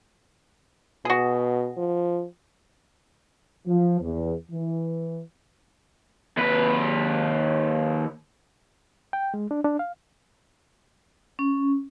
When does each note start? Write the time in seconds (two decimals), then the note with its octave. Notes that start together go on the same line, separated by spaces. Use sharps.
1.05 B2 F#4 G#4
1.77 F3
3.67 F3
4.01 E2
4.50 E3
6.38 D#2 B4
9.13 G5
9.34 G#3
9.51 D4
9.64 D4
9.79 F5
11.39 C#4